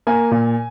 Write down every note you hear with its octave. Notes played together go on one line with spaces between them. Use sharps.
A#3 G#5
A#2